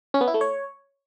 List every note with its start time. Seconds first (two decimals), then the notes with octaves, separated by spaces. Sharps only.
0.14 C#4
0.21 B3
0.28 E4
0.34 A3
0.41 C#5